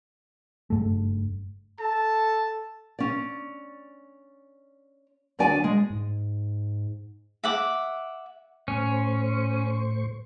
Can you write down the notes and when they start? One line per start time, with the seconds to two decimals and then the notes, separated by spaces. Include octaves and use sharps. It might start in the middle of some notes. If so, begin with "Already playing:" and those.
0.70 F#1 G2 A3
1.80 A4 A5
2.99 C#4 D5
5.39 D2 F#3 D4 D5 G#5
5.64 G#3
5.90 G#2
7.44 E5 F#5 D6
8.68 A2 C#4 C5 C#6